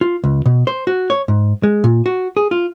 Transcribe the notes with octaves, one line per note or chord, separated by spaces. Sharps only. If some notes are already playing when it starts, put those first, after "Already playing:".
F4
C#2
B2
C5
F#4
C#5
G#2
G#3
A#2
F#4
G#4
F4